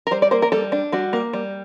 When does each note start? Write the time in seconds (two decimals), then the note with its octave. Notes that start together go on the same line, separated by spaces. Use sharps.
0.07 A#4
0.11 G3 C5
0.22 D5
0.31 A#3 C5
0.42 A#4
0.52 G3 A4
0.72 D4
0.92 G3 F#4
1.13 A#3
1.33 G3